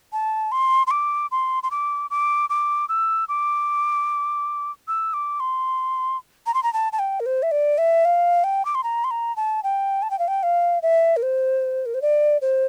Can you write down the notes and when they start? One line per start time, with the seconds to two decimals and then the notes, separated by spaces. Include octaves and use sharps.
0.13 A5
0.52 C6
0.87 C6
0.91 D6
1.32 C6
1.63 C6
1.71 D6
2.10 D6
2.50 D6
2.89 E6
3.29 D6
4.88 E6
5.14 D6
5.40 C6
6.47 A#5
6.54 C6
6.63 A#5
6.73 A5
6.93 A5
6.99 G5
7.20 A#4
7.26 C5
7.43 E5
7.51 D5
7.78 E5
8.05 F5
8.44 G5
8.65 D6
8.75 C6
8.84 A#5
9.04 C6
9.11 A#5
9.36 A5
9.64 G5
10.03 A5
10.11 G5
10.19 F5
10.28 G5
10.43 F5
10.82 E5
11.17 A#4
11.23 C5
11.86 A#4
11.94 C5
12.02 D5
12.42 C5